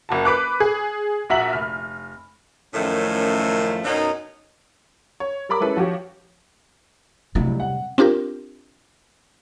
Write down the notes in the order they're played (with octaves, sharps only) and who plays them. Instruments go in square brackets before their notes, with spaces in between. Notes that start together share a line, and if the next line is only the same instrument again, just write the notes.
[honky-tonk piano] F#1 F#4 A5
B4 D6 F#6
G#4
A#1 F#4 E5 A#5 F#7
F1 F6
[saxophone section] F#2 A2 D#3 F3 A3 C#4
F#2 B2 F#3 D#4
[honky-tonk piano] C#5
G3 A#4 B5 D6
G#3 C#4 E4 A4 B4
F3 F#4 G4 C#5
[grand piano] F1 A2 F#3 [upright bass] C3 G3
[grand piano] F#5
[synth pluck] C4 D4 F4 G4 A#4